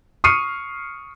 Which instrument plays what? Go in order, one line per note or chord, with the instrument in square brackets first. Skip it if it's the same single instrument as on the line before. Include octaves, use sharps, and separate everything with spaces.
[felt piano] C#6 D#6 F6 C7 C#7 D#7